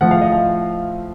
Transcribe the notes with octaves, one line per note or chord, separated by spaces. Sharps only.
A2 F3 A3 F#5
F5
D#5
F5